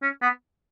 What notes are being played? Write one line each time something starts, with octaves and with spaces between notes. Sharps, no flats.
C#4
B3